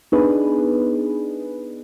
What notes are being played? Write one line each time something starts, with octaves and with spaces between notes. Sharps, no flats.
B3 D4 D#4 G#4 B4